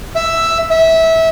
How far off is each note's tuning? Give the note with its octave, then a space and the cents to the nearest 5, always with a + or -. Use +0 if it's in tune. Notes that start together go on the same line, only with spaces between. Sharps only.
E5 +5
E5 -20